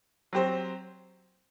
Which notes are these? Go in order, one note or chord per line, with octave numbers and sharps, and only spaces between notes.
F#3 C4 G4 C5